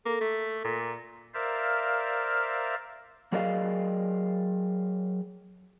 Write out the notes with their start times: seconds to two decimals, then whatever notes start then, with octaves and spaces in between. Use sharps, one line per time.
0.06 A#3 A4
0.21 A3
0.64 A#2
1.34 A#4 C5 D5 E5 F5
3.32 F#3 G#4 A#4 D5 D#5 F5